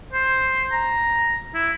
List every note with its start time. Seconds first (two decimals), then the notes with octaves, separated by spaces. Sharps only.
0.13 C5
0.72 A#5
1.54 E4